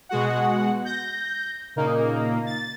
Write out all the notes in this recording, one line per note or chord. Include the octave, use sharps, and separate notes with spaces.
B2 G#3 F#4 F#5
G6 A#6
A#2 C#3 A#3 D#4
A6